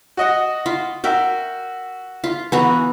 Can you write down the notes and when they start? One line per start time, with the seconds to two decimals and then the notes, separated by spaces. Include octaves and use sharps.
0.17 F#4 D#5 F#5
0.66 F4
1.04 F#4 A#4 E5 G5
2.24 F4
2.52 E3 B3 F#4 A#5